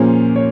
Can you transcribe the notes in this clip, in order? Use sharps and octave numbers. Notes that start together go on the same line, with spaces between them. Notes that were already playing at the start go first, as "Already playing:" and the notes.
Already playing: A#2 F3 A#3 C#4 G#4 C5
C#5